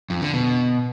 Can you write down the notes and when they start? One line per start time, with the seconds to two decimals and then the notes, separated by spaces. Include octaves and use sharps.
0.10 F2
0.22 D3
0.33 B2